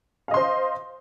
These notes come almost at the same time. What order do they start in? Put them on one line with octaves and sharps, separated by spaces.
F5 D#5 C6 C5